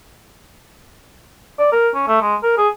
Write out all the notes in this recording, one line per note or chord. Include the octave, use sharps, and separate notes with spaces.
D5
A#4
C#4
A3
G#3
A#4
G#4